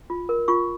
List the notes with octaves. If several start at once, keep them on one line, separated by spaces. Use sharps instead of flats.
F4
A#4
F4 C#6